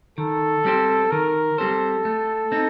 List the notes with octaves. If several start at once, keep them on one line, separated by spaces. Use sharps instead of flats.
D#3 A4
G3 C4 G4 C5
D#3 A#4
G3 C4 G4 A4 C5
A3
C4 D#4